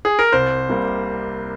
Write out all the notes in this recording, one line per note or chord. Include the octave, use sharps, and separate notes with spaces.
G#4
A#4
C2 C5
C3 G3 A#3